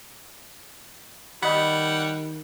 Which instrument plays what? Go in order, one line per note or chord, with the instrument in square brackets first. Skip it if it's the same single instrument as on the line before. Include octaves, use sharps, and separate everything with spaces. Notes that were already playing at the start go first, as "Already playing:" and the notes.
[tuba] D#3 [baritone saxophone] G3 [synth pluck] D#5 B5 [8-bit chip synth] F#5